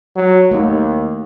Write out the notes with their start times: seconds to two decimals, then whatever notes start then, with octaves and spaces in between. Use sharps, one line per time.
0.16 F#3
0.51 D#2 A3 D#4